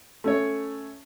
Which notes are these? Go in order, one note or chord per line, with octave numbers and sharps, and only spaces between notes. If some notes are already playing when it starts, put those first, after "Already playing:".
A3 C#4 C#5